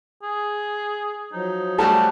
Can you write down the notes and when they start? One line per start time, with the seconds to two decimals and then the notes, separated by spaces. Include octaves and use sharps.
0.23 G#4
1.33 F3 F#3 D#4
1.78 G3 A3 F#4 A5